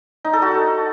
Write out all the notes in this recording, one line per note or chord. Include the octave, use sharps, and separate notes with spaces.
D#4
A4
F#4